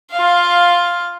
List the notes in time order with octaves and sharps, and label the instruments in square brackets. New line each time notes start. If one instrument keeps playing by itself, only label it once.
[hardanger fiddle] F4 F5